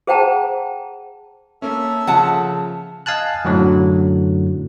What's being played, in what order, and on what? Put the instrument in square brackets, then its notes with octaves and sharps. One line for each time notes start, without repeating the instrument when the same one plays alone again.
[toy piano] G#4 C5 F#5 G5 A5 A#5
[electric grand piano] A#3 C#4 [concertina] A4 E5
[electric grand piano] C#3 F3 [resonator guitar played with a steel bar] F#5 A5
[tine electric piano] D#5 F5 G#5 A5 F#6
F#2 A2 D3 F#3